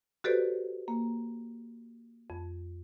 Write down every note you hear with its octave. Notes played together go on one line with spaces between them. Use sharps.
F#4 G4 A4 B4 C5 D5
A#3
F2